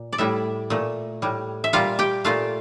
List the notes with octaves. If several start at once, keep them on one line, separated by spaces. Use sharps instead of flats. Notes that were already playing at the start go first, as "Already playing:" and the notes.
Already playing: A#2
D5
A2 G3 E4 E5
A#2 A3
A2 G3
E5
A#2 G3 F4 F5
G4 G5
A#2 A3 F4 F5